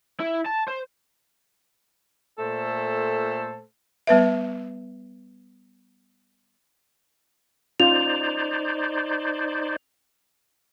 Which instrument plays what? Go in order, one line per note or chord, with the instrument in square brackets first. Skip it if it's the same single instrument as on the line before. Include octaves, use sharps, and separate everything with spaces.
[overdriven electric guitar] E4
A5
C5
[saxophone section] A#2 A3 A4 C5
[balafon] G3 B3 B4 E5
[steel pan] C#4 F4 [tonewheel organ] D#4 C5 D5 [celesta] F7